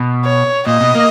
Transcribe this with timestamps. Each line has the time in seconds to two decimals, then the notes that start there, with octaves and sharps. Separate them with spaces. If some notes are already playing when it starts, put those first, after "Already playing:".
Already playing: B2
0.25 C#5
0.67 A#2 D#5
0.81 B2
0.95 A#3